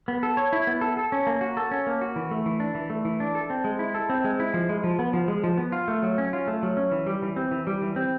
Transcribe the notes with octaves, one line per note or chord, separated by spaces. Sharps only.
B3
A4
C#5
E4
B3
A4
A4
C#4
A#3
F#4
A4
C#4
A#3
F#4
E3
A3
E3
D4
E3
A3
E3
D4
A4
C4
G#3
E4
A4
C4
G#3
E4
F3
G#3
F3
B3
F3
G#3
F3
B3
F4
A3
F#3
C#4
F4
A3
F#3
C#4
E3
G3
E3
C4
E3
G3
E3
C4